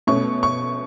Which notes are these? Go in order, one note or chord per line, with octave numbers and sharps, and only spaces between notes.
B2 A3 C#4 C#6
C#6